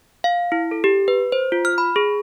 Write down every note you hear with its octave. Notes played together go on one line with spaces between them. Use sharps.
F5
E4
A4
G4
B4
C5
F4
F6
B5
G#4